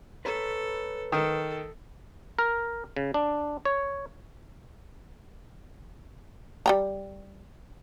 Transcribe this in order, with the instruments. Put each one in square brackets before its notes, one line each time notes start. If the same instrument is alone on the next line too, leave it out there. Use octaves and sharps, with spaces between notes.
[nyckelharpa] A4 [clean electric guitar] B4 C#5 A#5
[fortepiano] D#3 [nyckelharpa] A4
[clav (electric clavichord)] A#4
C#3
D4
C#5
[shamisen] G3 G5 A#5